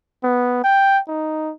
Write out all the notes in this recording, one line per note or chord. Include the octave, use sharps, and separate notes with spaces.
B3
G5
D#4